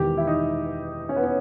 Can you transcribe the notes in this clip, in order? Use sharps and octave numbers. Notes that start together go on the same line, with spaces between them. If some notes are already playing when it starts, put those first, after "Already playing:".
Already playing: E1 E2 D#3 G4
E4
D#4
C#4
B3
C#4